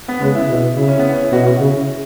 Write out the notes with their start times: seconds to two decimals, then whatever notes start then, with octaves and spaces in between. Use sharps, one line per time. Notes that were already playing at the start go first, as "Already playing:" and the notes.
0.08 B3
0.21 C#3 G#3
0.35 E4
0.49 B2
0.76 C#3 E4
0.88 C#4
0.99 B3
1.11 C#4
1.22 E4
1.32 B2 F#4
1.47 F#4
1.60 C#3 E4